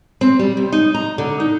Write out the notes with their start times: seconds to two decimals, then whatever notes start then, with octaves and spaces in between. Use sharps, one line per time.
0.21 C4
0.39 G3
0.57 C3
0.72 D#4
0.94 A#5
1.18 D3
1.40 D#4